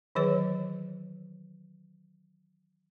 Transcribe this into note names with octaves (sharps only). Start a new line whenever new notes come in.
D#3 E3 F#3 G#4 B4 C#5